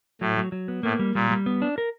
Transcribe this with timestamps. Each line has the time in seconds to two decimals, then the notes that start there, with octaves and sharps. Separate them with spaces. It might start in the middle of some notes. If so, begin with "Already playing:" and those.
0.21 A2 F#3
0.37 F#3
0.52 F#3
0.68 B3
0.83 A2 A#3
0.99 G3
1.15 A#2 G3
1.30 G3
1.46 B3
1.62 D4
1.78 A#4